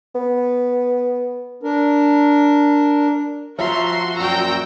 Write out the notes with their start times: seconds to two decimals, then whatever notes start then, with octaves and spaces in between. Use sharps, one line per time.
0.15 B3
1.63 D4 A#4
3.59 F3 F#4 E5 A#5 C6
4.16 F#2 A#2 G5 A#5 E6